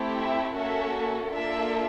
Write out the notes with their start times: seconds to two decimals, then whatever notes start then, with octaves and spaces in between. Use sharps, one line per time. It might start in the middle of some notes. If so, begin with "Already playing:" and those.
Already playing: A3 C4 E4 G4
0.18 E5
0.56 A#3 C#4 F#4 A4 E5
1.32 A#3 D4 F4 A4 E5